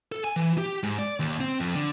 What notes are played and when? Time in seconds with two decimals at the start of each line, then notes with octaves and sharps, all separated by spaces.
0.12 A4
0.24 G#5
0.36 E3
0.58 G4
0.83 G#2
0.99 D5
1.20 D#2
1.41 C4
1.60 F2
1.75 D3